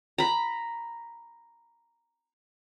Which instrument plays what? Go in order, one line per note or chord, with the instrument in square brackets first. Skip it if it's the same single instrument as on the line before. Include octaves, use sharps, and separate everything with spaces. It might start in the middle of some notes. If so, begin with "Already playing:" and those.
[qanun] A#5 B5